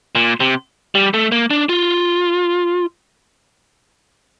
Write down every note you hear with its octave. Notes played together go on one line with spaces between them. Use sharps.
A#2
C3
G3
A3
A#3
D4
F4